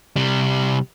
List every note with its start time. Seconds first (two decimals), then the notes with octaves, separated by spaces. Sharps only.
0.16 C3 G3